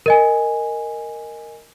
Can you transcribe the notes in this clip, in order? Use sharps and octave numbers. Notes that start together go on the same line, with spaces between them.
A#4 D#5 G#5